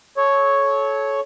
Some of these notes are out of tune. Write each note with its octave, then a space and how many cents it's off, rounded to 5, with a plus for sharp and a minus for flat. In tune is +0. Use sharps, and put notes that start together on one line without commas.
A4 -30 C#5 +0